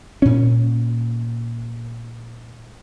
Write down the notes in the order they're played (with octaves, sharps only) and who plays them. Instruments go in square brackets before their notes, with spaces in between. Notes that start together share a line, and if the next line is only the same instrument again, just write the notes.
[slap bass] A#2 C#4